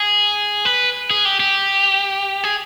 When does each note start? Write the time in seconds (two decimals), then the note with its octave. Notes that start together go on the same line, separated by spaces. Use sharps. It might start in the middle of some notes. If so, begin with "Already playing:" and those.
Already playing: G#4
0.65 B4
1.11 G#4
1.25 G4
1.40 G4
2.44 G#4